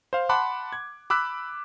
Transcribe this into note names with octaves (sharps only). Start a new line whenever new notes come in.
C5 F5
F#5 A5 B5 C6 D6 F#6
G#6
B5 D6 E6 F#6 B6